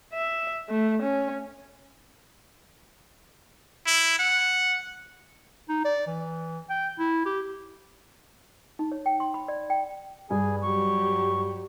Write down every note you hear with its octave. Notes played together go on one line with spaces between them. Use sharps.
E5
A3
C#4
E4
F#5
D#4
D5
E3
G5
E4
G4
D#4
C#5
G5
C6
B5
D5
G5
G2 G#4 G#5
F#3 G4 C#6